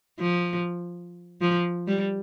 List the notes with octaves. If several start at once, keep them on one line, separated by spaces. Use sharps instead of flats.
F3
F3
G3